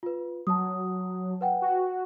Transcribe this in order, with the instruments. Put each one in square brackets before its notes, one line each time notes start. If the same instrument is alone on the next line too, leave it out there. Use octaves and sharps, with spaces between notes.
[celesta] F4 B4
[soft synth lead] F#3 [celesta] A5 D#6
[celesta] B4 F#5 G5
[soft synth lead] F#4